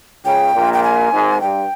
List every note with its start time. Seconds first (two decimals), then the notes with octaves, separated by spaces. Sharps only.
0.25 C#2 C#3 G5
0.54 A#1 A#2
0.73 G5
0.83 G#5
1.11 G#1 G#2
1.40 G2 G5